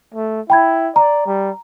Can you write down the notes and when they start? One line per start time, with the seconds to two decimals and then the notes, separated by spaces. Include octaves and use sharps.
0.14 A3
0.50 E4 G5 B5 G#6
0.96 D5 A#5
1.26 G3